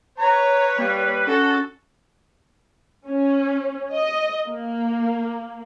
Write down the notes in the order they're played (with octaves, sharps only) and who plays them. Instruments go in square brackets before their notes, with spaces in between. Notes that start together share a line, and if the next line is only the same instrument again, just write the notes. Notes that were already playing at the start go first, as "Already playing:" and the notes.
[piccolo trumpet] B4 [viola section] C#5 [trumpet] A#5
[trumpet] G3 [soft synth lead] A#3
[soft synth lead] C#4 [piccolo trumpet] F#4 [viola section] A4
[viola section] C#4
D#5
A#3